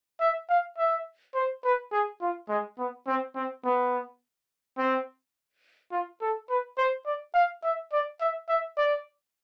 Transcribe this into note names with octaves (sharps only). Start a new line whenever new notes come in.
E5
F5
E5
C5
B4
G#4
F4
G#3
B3
C4
C4
B3
C4
F4
A4
B4
C5
D5
F5
E5
D5
E5
E5
D5